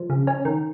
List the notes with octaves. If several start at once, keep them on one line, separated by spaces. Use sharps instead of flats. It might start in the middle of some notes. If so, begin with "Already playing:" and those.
Already playing: F3
C#3
C#4
D#3